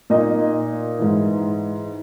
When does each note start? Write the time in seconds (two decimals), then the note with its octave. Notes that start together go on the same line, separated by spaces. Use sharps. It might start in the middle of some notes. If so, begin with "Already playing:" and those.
0.10 A#2 D#4 D#5
0.99 G#2 E3